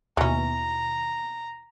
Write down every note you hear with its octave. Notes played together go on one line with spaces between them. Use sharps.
D#2 B2 E3 C#4 A#5